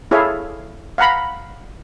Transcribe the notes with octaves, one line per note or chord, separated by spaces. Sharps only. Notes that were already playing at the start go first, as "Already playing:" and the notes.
E4 G#4 A4 C#5 E5 F5
F5 F#5 A#5 B5